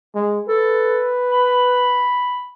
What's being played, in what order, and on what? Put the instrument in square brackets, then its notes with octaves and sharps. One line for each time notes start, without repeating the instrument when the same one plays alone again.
[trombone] G#3
[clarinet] A4 [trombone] B4
[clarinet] B5